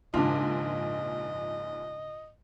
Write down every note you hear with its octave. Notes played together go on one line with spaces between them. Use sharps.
A#1 D#2 G#2 C#3 D4 F4 D#5